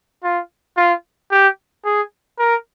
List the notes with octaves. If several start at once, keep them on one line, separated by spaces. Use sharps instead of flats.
F4
F4
G4
G#4
A#4